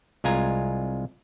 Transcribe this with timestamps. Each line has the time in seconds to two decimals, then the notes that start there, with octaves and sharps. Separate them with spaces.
0.24 C2 G#3 F4 G#5 A#5